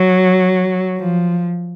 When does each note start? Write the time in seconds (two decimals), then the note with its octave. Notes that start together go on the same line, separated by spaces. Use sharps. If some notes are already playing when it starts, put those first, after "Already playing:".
Already playing: F#3
0.99 F3